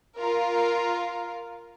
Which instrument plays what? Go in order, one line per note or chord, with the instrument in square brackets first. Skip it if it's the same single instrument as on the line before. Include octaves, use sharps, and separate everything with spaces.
[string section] F4 A#4